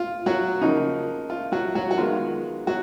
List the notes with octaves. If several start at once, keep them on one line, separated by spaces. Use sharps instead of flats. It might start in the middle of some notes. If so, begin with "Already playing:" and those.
Already playing: F4
F#3 F#4
C#3 F3 A#3 D#4
F4
F#3 F#4
F#3 F#4
F#4
D#3 G#3 B3 F4
F#3 F#4